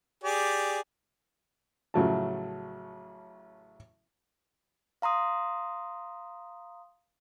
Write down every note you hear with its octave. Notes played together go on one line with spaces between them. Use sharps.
G4 G#4 D5
A1 C#3 F3 F#3 A3 A5
F5 A#5 C6 D#6